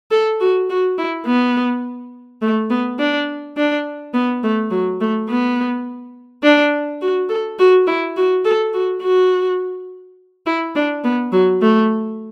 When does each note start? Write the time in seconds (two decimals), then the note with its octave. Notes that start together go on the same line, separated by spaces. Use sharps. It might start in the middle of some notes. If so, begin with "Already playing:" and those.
0.11 A4
0.40 F#4
0.70 F#4
0.98 E4
1.26 B3
2.42 A3
2.70 B3
2.99 D4
3.57 D4
4.14 B3
4.43 A3
4.71 F#3
5.01 A3
5.29 B3
6.43 D4
7.02 F#4
7.29 A4
7.59 F#4
7.87 E4
8.17 F#4
8.45 A4
8.73 F#4
9.02 F#4
10.46 E4
10.75 D4
11.04 B3
11.32 F#3
11.61 A3